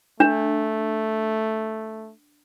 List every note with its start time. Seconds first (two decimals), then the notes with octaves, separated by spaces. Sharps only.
0.20 A3 D4